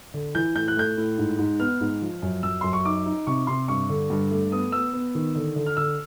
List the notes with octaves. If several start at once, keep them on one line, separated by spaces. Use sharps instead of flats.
D3
E3 G6
A2 G6
F#6
A3 G6
A2
G#2
G#2
B3 F6
G#2
F3
F#2
F#2 E6
F#2 C6
C#6
D#4 D6
D#4
C3 C#6
C3 C6
G2 C#6
D3
G2
A3
B3 D#6
B3 E6
B3
D#3
D3
D3
F6
D3 E6